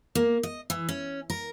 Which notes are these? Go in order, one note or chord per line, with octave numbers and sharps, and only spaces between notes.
A#3
D#5
E3
C#4
A#4